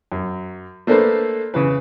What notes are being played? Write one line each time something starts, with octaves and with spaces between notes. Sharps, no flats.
F#2
A3 A#3 D4 A4 B4 C5
C#3 E3 B4